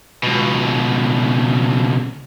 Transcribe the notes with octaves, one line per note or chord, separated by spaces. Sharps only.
C#2 B2